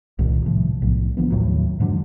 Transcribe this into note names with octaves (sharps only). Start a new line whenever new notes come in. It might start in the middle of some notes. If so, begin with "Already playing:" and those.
C2 A#2 D#3
A2 C3 F3
B1 A2
D3 F3 B3
D#2 A2 F#3
F2 G#2 D3 F#3